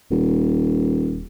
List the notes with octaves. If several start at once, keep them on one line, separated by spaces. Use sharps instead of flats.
D#1